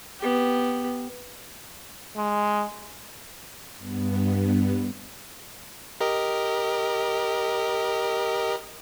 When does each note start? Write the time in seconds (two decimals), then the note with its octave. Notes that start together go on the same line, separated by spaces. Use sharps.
0.20 B3 G4
2.16 G#3
3.78 G2 B3
6.00 G4 A#4 D#5